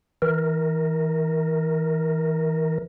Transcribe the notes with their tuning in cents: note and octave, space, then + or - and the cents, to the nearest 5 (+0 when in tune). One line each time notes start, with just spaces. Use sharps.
E3 -25 A#4 +0